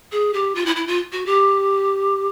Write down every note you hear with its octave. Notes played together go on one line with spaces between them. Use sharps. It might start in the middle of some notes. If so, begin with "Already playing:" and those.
G#4
G4
F4
E4
E4
F4
F#4
G4